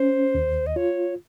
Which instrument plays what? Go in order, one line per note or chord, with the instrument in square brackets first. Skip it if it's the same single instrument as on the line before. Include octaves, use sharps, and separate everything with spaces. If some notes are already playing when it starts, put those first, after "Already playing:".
Already playing: [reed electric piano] C#4 [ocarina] C5
[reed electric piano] D#2
[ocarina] D#5
[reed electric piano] F4 [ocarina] C#5